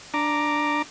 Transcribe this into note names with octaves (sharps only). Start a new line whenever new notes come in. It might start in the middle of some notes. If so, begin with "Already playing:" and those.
D4 A#5 D6